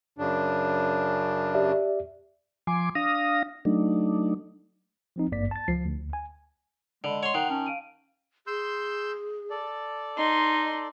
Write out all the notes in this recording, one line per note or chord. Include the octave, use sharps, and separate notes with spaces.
F#2 C#3 D4
G4 D5 E5
F3 G#5 C6 D6
D4 F5 D#6 A#6
F#3 A3 D4 D#4
F3 C4 D#4
G#1 G2 A#3 D5 B6
A5 A6
C#2 F3 C7
D2
G#5
D3 G#3 D5 A5 B5
C#5 F#5 C6
D#3 F#5 C7 F7
C#4 A5
F5 D7 D#7
G#4 C6 E6 G6
A4 D5
D#4 D#5 C6